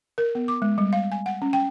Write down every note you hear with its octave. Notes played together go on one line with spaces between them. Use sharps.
A#4
B3
D6
G#3
G3
F5
G#5
F#5
C#4
G5